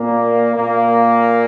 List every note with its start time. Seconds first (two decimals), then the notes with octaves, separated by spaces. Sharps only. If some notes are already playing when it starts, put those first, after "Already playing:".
Already playing: A#2 A#3
0.56 A#2 A#3